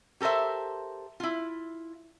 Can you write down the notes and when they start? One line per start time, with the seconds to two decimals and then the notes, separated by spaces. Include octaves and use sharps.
0.21 G4 A4 A#4 C5 E5
1.20 E4 F4